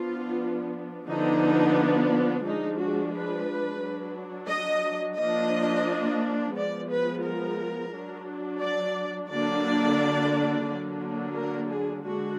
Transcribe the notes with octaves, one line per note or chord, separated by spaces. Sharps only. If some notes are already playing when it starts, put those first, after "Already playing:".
Already playing: F3 B3 D4 F4
D3 F3 B3 D4 D#4
F3 G#3 D4 D#4
F#4
B4
F#3 D4
D#5
F3 A#3 D4 D#5
F3 G#3 B3 D5
B4
A#4
F#3 D4
D5
D3 F#3 A#3 D4 D5
D3 F#3 A#3 D4
A#4
G#4
D3 G#3 D4 F#4